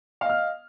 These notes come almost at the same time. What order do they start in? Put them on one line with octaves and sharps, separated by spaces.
F5 D#5 F6